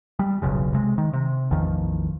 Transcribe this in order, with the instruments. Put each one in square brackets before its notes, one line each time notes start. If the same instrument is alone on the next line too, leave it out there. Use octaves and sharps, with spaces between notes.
[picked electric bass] G3
D#1 B1 F#2 C#3
C3 G#3
D#3
C3
A1 E2 D#3 F3